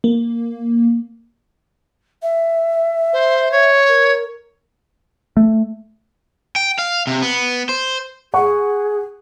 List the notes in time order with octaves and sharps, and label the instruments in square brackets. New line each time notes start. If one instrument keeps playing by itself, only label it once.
[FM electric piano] A#3
[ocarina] E5
[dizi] C5
C#5
[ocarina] A#4
[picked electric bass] A3
[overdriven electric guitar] G5
F5
C3
B3
C5
[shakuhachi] G#4 [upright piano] F#5 C#6